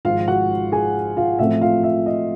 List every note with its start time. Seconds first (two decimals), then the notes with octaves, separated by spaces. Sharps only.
0.05 G#1 G#2 F3 F4 F5
0.28 F#4 F#5
0.72 G#4 G#5
1.17 F4 F5
1.39 A1 A2 F3 A3 C4 E5
1.61 F4 F5
1.83 E5
2.06 D#5